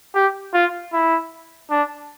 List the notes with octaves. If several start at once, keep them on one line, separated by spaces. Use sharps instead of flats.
G4
F4
E4
D4